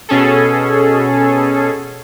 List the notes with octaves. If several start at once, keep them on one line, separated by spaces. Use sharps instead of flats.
B2 C#4 G#4 A4